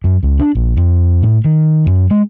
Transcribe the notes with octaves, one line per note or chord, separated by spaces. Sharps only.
F#2
C#2
D4
A#1
F2
A2
D#3
F#2
G#3